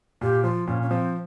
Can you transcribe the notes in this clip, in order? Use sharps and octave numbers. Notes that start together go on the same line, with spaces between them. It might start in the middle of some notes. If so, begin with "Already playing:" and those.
A#2 G4
F3 F4
A#2 C#4
C#4
F3 C4